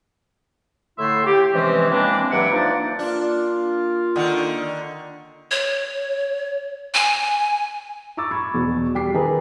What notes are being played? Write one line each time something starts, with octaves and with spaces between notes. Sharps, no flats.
A2 D3 A3 E4 E5 C6
G4
C3 E3 F3 G#3 C4 C#4
E3 G#3 A#3 C4 D4
G2 E3 F#3 E5 F#5 D6
F3 A#3 D4 D#4 D5
A#3 D4 F4
D3 D#3
C#5
G#5
A#5 C#6 D6 E6 A6
B5 C#6 G#6
E2 B2
E2 G3 G5 D6 B6 C7
D#3 G#4 B4 A#5